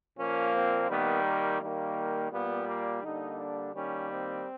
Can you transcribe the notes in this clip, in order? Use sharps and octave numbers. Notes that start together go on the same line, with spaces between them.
A#2 F3 A#3 C#4
C4
D#3 G3 A#3 B3
A#3
D#3 G3 A#3
A#2 G3 A#3 B3
A#3
D3 G3 A#3 D#4
D4
D#3 G3 A#3 C#4
C4